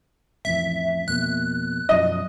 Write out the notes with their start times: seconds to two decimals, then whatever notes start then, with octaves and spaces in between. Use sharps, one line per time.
0.45 A1 F2 E3 E5
1.08 F2 B2 A#3 F#6
1.89 B1 F#2 F3 D#5